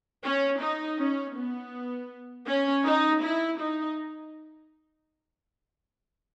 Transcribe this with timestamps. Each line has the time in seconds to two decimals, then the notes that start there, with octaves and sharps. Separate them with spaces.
0.23 C#4
0.61 D#4
0.99 C#4
1.36 B3
2.47 C#4
2.86 D#4
3.23 E4
3.60 D#4